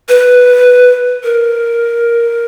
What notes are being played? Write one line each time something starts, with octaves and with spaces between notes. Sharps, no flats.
B4
A#4